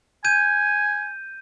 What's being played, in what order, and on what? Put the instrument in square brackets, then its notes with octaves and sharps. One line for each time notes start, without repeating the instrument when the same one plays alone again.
[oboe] G#5 [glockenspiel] G6 D#7